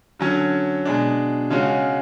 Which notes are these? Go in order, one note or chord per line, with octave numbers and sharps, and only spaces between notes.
D3 F#3 C#4
B2 G#3 D4
C#3 G#3 C#4 F#4